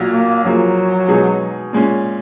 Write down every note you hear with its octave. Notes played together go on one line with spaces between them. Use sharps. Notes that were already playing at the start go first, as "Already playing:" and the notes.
Already playing: B1 A#2 F#3
A#3
F#2 F3 F#3 A#3 F4 G#4
B2 G#3 B3 D#4 G#4
A#2 G#3 C#4